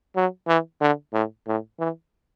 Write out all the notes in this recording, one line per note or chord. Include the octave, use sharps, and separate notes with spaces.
F#3
E3
D3
A2
A2
E3